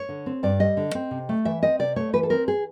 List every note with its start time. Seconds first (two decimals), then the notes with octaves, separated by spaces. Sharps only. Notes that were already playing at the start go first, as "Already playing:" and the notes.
Already playing: C#5
0.09 D3
0.26 C4
0.43 G2 D5
0.60 G3 D#5
0.77 D3
0.95 C4
1.11 C3
1.29 A3
1.45 E3 E5
1.62 C4 D#5
1.79 C3 D5
1.96 A3 C#5
2.13 E3 B4
2.23 A4
2.30 C4 A#4
2.48 G#4